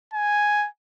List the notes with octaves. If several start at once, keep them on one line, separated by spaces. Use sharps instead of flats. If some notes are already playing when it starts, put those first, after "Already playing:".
G#5